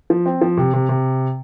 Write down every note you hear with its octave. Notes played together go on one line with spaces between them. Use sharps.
F3
C4
F3
C3
C3
C3